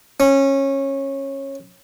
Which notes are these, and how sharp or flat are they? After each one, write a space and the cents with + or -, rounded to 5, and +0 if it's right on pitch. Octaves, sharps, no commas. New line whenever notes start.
C#4 -20